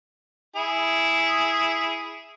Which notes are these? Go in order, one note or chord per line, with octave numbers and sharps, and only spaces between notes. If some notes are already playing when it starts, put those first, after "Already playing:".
E4 G#4